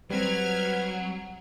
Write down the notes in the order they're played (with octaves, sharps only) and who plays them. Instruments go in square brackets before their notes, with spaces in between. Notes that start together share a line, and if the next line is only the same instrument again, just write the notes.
[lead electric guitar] F#3 [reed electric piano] G3 C4 [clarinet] B4 [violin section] F6 G#6